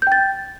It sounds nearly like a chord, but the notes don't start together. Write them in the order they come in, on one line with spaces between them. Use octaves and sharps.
G6 G5 A6